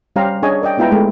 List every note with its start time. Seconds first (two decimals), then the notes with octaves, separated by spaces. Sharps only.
0.16 G3 C#4 G4 C5 F5 A#5
0.42 C#4 D4 G#4 C#5 D#5 G#5
0.62 A#4 D5 D#5 G5
0.77 G#3 B3 E4 F4 G5 A#5
0.91 G#3 A3 G4